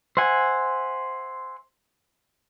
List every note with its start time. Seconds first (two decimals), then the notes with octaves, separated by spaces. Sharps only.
0.17 C5 E5 F#5 G#5